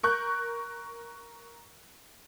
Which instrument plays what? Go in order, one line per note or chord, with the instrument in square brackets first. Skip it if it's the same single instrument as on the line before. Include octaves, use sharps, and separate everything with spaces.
[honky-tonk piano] A#4 C#6 F#6 G6